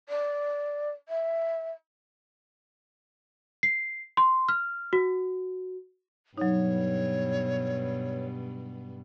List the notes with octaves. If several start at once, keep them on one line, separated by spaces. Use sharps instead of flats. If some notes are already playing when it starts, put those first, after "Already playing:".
D5
E5
C7
C6
F6
F#4
G2 B2 F#3 D#4 C#5